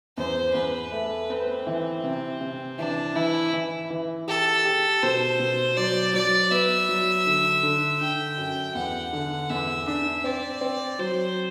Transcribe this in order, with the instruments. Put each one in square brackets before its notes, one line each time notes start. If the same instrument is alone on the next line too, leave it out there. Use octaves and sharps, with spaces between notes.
[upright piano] E2 [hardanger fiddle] C5
[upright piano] E2 [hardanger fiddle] B4
[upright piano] A3
[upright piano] B3 [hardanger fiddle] C4
[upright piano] E3
C3
C3
[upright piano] E3 [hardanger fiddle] D4
[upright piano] E3 [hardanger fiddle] E4
[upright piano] E3
E3
[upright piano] G4 [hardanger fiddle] A4
[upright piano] G4
[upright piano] B2 [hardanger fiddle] C5
[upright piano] B2
[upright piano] F#3 [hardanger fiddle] D5
[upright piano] F#3 [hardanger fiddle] D5
[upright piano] B3 [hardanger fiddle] E5
[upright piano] F#3
D3
D3
[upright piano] D3 [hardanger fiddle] G5
[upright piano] F#2
[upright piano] E2 [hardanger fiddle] F#5
[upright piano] D3
[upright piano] E2 [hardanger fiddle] E5
[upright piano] D4 [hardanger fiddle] E5
[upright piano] C4 [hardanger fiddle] D5
[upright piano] C4
[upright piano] F#3 [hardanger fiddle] C5